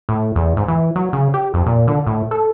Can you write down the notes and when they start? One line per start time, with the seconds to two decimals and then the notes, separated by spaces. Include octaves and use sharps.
0.09 A2
0.35 E2
0.57 G#2
0.68 E3
0.96 F#3
1.13 C#3
1.34 G4
1.54 F2
1.66 A#2
1.87 D3
2.07 A2
2.31 A4